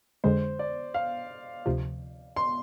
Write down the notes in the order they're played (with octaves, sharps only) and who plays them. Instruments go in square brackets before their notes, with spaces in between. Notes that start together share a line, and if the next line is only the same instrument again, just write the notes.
[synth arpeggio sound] F2 D3 G#3 [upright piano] C5
[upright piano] D5
F5
[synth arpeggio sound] D2 C3 F3
[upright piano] C6